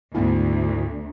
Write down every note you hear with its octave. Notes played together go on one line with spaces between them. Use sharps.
D2 G#2 A3 B3 E4 G#5